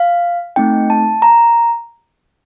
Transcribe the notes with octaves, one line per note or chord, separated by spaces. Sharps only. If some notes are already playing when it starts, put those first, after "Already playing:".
Already playing: F5
A3 C4 D#4 G5
A5
A#5